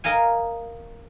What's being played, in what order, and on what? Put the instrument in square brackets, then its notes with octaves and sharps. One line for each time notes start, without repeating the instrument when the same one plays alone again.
[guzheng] A#4 D#5 F5 G#5